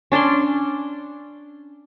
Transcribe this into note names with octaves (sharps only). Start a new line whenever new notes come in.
C#4 D4 D5 C6